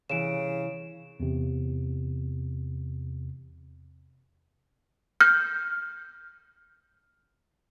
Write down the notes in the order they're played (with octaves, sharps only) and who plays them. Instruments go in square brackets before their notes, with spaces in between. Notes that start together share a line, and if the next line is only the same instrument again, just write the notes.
[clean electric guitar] C2 E3 [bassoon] C#3 [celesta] D7 E7
[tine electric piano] E2 C3
[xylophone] F6 G6